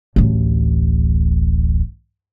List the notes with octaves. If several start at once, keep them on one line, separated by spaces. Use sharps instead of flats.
D1 A1